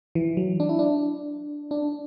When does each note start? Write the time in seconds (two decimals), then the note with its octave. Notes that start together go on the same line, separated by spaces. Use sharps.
0.15 E3
0.37 F#3
0.60 D4
0.69 E4
0.79 D4
1.71 D4